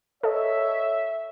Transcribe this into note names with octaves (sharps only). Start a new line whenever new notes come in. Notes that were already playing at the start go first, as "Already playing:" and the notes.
A4 C#5 D#5 E5